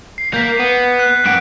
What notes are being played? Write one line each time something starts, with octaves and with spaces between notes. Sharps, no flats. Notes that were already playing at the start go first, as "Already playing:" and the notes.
C7
A#3 G6 B6
B3
F#6
G2 F#4 D7